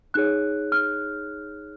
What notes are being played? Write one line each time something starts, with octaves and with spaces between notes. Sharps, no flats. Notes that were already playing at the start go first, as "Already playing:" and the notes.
D#4 G#4 C#5 F#6
F6